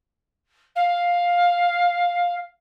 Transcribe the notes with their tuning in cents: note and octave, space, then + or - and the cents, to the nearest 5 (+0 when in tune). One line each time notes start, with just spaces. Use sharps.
F5 +10